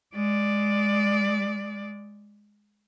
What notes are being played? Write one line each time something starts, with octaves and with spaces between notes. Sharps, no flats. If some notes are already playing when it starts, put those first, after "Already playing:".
G#3 D5